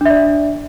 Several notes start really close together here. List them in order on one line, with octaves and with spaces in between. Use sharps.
D4 E5 D5